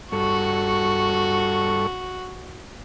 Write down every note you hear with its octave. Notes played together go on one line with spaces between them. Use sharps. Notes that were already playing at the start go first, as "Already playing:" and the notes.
G2 F#4 A4 C#6